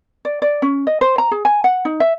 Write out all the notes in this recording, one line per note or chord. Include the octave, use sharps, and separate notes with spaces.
D5
D5
C#4
D#5
C5
A#5
G#4
G#5
F#5
D#4
E5